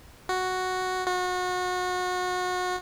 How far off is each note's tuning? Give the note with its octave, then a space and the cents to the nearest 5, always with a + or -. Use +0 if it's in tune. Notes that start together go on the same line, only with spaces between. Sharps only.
F#4 +0
F#4 -30